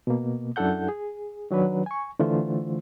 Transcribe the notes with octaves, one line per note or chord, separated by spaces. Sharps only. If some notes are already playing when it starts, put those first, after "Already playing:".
B2 A#3
F#2 D4 E4 A4 F#5 G6
G#4
D#3 F#3 D4 B4
G#5 C#6
D3 E3 A3 F4 C5